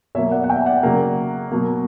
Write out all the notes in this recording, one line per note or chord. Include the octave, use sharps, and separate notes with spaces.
B2 F#3 A#3 C#5 E5
D5 F#5
F#5
E5 G5
D5 F#5
C#3 F#3 A#3
B2 F#3 A#3